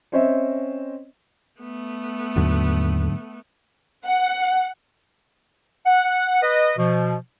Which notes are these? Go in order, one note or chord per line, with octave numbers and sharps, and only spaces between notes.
C4 C#4 C5 C#5 D#5 E5
A3 B3
D#2 G#2 D3 F#3
F#5
F#5
B4 D#5
B2 F3